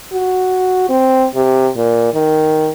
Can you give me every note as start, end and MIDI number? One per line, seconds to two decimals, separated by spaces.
0.13 0.86 66
0.90 1.26 60
1.35 1.69 48
1.77 2.11 46
2.14 2.70 51